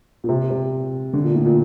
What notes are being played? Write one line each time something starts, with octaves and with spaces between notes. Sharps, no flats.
A#2
C3
C3
D3
A#2
A2
A#2